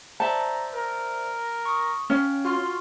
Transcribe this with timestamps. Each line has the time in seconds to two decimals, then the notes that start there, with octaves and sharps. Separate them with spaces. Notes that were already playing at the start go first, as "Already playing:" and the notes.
0.20 C5 D5 E5 A5 A#5
0.73 A#4
1.65 C#6 D#6
2.10 C#4 F5 G5
2.45 F4 F#4 C6 F6